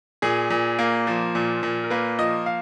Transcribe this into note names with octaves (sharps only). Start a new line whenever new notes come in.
A#2 G#4
A#2
A#3
F3
A#2
A#2
A#4
A#3 B4
F3 D#5
F5